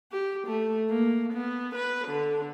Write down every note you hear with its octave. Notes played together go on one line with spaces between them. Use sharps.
G4
A3
A#3
B3
B4
D3